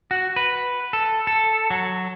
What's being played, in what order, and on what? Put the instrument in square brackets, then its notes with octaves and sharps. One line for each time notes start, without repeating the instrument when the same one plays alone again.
[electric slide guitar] F#4
B4
A4
A4
F#3